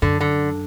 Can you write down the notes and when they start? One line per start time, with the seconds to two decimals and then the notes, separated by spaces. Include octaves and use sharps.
0.02 F#2 D3
0.21 D3